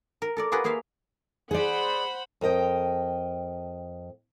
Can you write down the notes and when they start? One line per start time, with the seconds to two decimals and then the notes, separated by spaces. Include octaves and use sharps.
0.22 A#4
0.37 A4 A#4 D5
0.52 F4 G4 G#4 A#4 B4 F#5
0.64 A#3 G#4 C5 E5 F5
1.51 G#4 C5 D5 F#5 B5
2.41 F2 A#4 D#5 G5